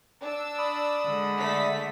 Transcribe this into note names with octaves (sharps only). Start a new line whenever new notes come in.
D4 E6
D5 B5 D#6
D3 G#3
A3 B6